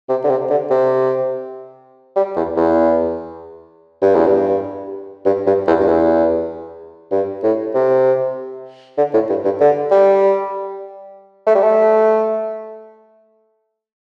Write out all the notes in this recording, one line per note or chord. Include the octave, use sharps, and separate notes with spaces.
C3
D3
C3
D3
C3
G3
E2
E2
G2
E2
G2
G2
G2
E2
G2
E2
G2
A2
C3
D3
A2
G2
G2
D3
G3
A3
G3
A3